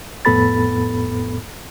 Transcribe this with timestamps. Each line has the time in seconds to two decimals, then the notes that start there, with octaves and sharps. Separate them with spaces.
0.25 F2 A2 B3 A4 B5 A6